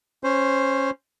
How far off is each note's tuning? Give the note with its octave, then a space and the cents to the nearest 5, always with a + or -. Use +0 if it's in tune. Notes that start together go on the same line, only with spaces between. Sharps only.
C#4 -15 C5 +0